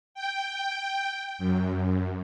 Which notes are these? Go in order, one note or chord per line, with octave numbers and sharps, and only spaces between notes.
G5
G5
F#2